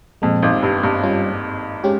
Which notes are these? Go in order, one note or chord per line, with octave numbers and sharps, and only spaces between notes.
F2 A#2 F3 G#3
G#1 G#2
G2
G2
G3 C#4 F4
G#3 C#4 G4